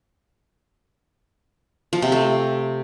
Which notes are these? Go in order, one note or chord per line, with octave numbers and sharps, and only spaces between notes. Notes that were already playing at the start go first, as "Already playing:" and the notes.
F3
C3
A3